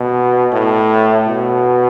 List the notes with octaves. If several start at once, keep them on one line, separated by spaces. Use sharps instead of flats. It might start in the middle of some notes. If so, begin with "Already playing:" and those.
Already playing: B2
A2
B2